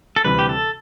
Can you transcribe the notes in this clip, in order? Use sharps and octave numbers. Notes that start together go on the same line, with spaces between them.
A4
D2 C3 E3 G3 B4
G4
A4